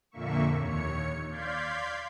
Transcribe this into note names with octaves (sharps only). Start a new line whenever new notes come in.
F2 A#2 D3 A#3 E5 C#6
D#2 C#5 C#7
D5 F5 C6 G6 G#6 B6